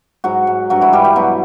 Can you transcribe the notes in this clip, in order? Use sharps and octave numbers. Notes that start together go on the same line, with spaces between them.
G#2 F#3 F#4
G#2
G2 F#3 F#4
E3 E4
G2 G3 G4
G3 G4
B2 F#3 F#4